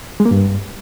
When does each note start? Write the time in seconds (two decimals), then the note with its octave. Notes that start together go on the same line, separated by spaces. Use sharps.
0.20 G#3
0.26 A#3
0.31 G2